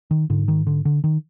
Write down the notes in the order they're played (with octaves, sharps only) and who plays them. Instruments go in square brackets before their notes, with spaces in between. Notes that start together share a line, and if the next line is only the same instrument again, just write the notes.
[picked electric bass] D#3
G#2 D3
D#3
D3
D3
D#3